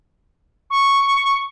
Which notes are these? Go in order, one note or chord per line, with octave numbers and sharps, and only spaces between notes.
C#6